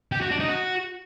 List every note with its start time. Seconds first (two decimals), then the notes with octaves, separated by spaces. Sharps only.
0.12 G4
0.21 F#4
0.30 D4
0.40 D#4
0.49 F#4